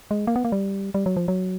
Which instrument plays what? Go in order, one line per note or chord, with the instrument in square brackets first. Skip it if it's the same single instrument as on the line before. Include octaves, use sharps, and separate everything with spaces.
[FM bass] G#3
A#3
B3
A#3
G3
G3
F#3
F3
F#3